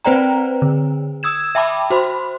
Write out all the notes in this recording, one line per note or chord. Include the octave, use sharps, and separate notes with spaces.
C4 B4 C5 D5 G5 A#5
D3
D#6 E6 G#6 E7
E5 G5 A5 B5 D6
F#4 C5 B5 C6